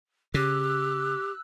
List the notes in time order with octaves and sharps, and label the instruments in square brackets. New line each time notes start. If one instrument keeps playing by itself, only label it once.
[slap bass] C#3 [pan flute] G4 [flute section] E6 F#6